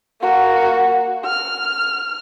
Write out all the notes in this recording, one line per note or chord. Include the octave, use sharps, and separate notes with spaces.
A#3 F#4
F6